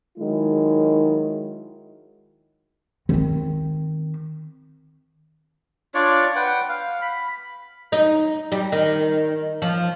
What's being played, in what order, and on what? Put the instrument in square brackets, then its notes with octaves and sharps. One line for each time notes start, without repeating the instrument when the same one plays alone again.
[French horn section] D#3 F#3 G#3 E4
[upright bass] D#3 C4
[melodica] D4 F4 C#5 D5
B4 F#5 G5
F5
B5
[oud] D#4
G3
D#3
F3